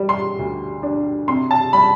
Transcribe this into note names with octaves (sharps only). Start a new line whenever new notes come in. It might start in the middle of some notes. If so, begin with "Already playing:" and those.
Already playing: G3
C6
D2
D4
C3 C6
A5
G3 B5